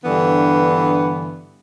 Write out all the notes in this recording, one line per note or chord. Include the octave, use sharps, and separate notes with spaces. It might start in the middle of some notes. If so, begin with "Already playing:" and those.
G2 D3 E3 B3